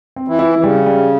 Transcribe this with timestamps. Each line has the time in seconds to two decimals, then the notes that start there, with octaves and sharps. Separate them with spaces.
0.16 C4
0.28 E3
0.39 E4
0.59 E3
0.63 C#3 G3
0.86 G3